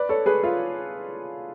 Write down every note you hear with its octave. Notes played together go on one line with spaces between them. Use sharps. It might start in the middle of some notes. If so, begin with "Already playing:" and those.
Already playing: B4 D5
A4 C#5
G#4 B4
F4